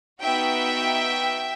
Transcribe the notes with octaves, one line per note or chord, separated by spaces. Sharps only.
B3 D#4 F#4 E5 G5